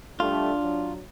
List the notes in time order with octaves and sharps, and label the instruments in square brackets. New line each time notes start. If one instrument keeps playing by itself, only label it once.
[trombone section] G3 A3 [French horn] D4 [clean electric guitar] F4
[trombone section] F#3